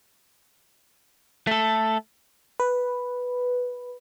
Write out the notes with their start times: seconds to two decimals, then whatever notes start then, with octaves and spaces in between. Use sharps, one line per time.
1.47 A3 A4
2.60 B4